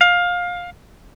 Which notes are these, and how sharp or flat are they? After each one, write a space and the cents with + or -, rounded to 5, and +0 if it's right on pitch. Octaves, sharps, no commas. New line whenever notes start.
F5 +20